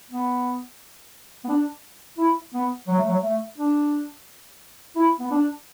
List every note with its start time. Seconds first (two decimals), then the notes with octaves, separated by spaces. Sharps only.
0.10 B3
1.44 B3
1.48 D4
2.18 E4
2.54 B3
2.87 F#3
2.98 A3
3.08 F#3
3.23 A3
3.58 D4
4.96 E4
5.20 B3
5.31 D4